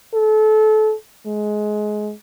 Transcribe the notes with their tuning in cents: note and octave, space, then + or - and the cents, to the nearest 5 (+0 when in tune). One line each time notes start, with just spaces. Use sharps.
A4 -30
G#3 +20